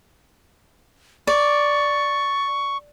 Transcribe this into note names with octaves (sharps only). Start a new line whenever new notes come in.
D5 C#6